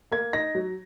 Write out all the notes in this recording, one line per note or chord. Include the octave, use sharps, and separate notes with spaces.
A#3 G#6
D#4 A#6
F#3